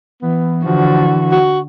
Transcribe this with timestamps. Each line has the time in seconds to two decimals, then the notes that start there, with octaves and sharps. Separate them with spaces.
0.22 E3 B3
0.65 D3 F3 F#4
1.32 F#4